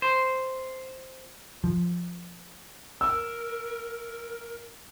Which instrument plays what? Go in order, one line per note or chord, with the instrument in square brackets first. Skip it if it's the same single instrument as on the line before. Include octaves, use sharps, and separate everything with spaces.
[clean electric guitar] C5
[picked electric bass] F3
[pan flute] A#4 [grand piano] E6